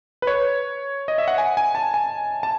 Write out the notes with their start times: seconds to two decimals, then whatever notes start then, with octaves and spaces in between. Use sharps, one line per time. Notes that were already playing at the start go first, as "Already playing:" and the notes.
0.22 B4
0.27 C#5
1.08 D#5
1.18 E5
1.28 F#5
1.38 G#5
1.57 G#5
1.75 A5
1.94 G#5
2.43 A5